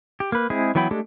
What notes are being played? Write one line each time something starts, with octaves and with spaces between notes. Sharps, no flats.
G4
A#3 B4
G#3 C4 E4 G#4
E3 F#3 B3 G5 B5
G#3 A3 D4 G4 A4